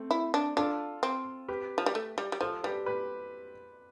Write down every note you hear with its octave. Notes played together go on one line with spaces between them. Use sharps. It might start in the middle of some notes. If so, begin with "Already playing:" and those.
Already playing: A3 C4
E4
D4
D4 F4 A4
C4
G4 B4
F3
G3
A3
G3
G3
F3 A4 C5
G3 G4 B4
G4 B4